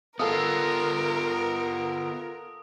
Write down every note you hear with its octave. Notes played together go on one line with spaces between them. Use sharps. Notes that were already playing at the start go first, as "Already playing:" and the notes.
B3 F4 A4 A#4 F5 D#6